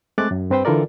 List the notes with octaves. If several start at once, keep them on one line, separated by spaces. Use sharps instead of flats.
G#3 A3 C4 D6 F#6 A6
F#2
G2 C4 B4 C5 G5
D3 E3 F4 A4 A#4 D5